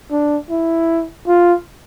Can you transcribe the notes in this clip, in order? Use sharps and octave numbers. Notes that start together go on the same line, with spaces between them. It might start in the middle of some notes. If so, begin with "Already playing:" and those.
D4
E4
F4